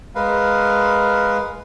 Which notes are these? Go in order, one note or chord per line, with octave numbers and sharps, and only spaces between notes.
G#3 A#4 B4 F5